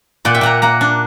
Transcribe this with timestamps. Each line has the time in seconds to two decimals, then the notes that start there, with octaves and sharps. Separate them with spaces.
0.25 A#2 D5 F#5
0.34 E5 G5
0.41 A#2 F#5 A#5
0.62 A#3 F#5 A#5
0.81 D4